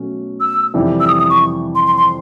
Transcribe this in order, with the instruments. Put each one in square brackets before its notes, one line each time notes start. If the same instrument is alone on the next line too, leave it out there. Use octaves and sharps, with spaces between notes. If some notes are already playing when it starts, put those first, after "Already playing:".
Already playing: [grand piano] B2 F#3 A3 C#4
[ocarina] E6
[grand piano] F2 C3 E3 G3
[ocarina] E6
D#6
D#6
C#6
C6
C6
C6